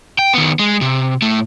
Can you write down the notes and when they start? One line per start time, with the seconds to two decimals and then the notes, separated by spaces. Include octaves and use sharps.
0.18 G5
0.33 D#3 B3
0.59 G#3
0.81 C3
1.22 A2 A3